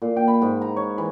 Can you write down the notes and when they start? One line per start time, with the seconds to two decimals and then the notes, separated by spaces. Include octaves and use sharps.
0.02 A#2
0.16 G5
0.28 B5
0.42 G#2
0.61 A#5
0.76 C#5
0.98 E3